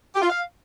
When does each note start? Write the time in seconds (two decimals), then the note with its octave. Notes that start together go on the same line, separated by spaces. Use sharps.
0.15 G4
0.22 F4
0.29 F5